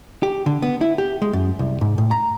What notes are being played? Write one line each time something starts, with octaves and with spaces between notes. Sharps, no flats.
G4
D3
B3
E4
G4
G#3
F#2
C2
G#2
A2
A#5